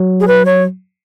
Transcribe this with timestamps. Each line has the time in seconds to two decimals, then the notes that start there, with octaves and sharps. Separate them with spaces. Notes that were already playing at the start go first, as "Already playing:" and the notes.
Already playing: F#3
0.20 G#4
0.28 B4
0.45 C#5